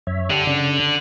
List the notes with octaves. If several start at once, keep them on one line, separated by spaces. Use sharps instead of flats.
F#2 C#5 E5
D3 G4
C#3 D4